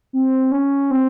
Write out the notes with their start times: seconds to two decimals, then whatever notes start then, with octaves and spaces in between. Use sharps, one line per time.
0.13 C4
0.52 C#4
0.91 C4